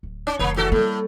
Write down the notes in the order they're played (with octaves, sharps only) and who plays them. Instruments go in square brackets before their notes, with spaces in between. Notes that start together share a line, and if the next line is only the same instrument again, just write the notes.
[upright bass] D1
[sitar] C#4
[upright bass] F1 D3 [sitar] A#3 C#5
[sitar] E2 F#4 A4
[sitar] A2 [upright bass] G3 A#3